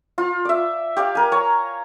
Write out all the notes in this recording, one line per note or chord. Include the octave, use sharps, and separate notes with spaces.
F4
D5 E5
G4 D5 F5
A#4 G#5
C#5 A#5